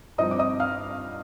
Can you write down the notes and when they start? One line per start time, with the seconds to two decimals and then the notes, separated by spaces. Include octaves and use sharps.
0.18 G2 F3 C4 D#4 D#5 D#6
0.31 D6
0.39 D#5 D#6
0.60 F5 F6